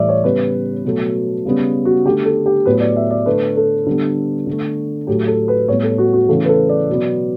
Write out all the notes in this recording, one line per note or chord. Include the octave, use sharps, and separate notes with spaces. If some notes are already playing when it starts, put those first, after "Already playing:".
Already playing: A2 E3 G3 D5 E5
C#5
C#3 G3 B3 B4
B2 F#3 A3
C#3 G3 B3
F#4
D3 A3 G4
A4
G4
A2 F#3 B3 B4
D5
E5
D5
D3 A3 B4
A4
D3 G3 B3
D3 A3
A2 F#3 A3 G4
A4
B4
A2 G3 B3 C#5
A4
F#4
F#4
C#3 E3 A3 A4
B4
A4
D5
B2 F#3 B3